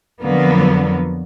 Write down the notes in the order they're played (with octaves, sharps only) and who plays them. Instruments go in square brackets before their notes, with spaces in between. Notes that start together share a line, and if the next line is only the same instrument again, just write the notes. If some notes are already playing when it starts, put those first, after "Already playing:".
[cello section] F2 D3 F3 F#3 A#3 B3